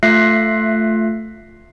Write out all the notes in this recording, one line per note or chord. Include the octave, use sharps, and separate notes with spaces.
A3 F4 E5 F#6 A#6 C7